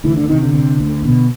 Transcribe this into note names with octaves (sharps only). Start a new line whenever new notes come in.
D2 E3
D3
C3 D#3
D3
C3
D2
B2